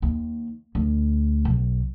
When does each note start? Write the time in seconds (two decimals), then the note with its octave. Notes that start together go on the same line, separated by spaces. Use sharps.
0.02 D#2
0.75 D2
1.45 B1